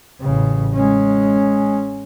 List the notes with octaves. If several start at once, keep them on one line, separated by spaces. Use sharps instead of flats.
A1 C#3
G#3 C#4